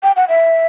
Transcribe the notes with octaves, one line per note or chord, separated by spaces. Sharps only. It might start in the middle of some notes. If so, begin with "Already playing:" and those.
G5
F#5
E5